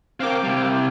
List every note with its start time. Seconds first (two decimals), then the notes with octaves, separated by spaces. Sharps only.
0.20 C4 A#4 F5 G5 D6
0.44 C3 G3